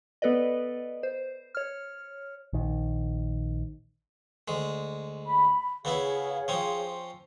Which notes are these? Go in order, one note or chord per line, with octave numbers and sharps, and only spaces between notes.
B3 A4 B4 D5 D#5
C5
C#5 F6
A#1 D#3
D2 G#3
B5
C#3 B3 E4 G#4 C#5 F5
F3 C4 C#4